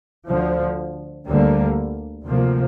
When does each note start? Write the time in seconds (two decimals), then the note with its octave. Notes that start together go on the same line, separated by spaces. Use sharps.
0.28 D2 D3 F3
1.27 D2 D3 G3 A#3
2.26 D2 C3 F3 A#3